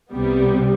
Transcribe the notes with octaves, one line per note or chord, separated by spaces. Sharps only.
C2 C3 G3 B3